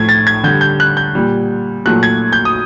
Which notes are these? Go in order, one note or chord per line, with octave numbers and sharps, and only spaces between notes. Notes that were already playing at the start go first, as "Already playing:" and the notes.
Already playing: A2 F3 A3 G#6
A6
G#6
D3 G3 G6
G6
F#6
G6
A#2 G3
A#2 F#3 A3 F#6
G#6
G6
D#6